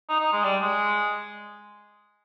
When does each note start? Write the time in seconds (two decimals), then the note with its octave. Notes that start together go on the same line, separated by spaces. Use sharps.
0.09 D#4
0.20 D#4
0.32 G#3
0.44 G3
0.61 G#3